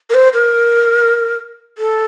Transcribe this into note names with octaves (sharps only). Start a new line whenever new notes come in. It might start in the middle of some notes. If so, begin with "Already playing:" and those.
A#4
C5
A#4
A4